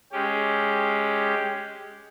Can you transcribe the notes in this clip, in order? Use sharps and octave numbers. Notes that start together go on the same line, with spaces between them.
G#3 C#4 G4